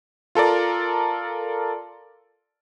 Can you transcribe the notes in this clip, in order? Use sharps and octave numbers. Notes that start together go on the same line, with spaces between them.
F4 A4 A#4 D5